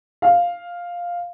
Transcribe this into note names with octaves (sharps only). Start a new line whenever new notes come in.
F5